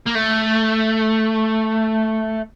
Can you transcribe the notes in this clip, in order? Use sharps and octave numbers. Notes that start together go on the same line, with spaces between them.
A#3
A3